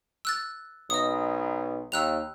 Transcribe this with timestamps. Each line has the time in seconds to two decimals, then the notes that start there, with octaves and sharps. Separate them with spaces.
0.25 E6 F#6 A6
0.90 B1 D#5 D#6
1.92 D#2 E6 F#6 F7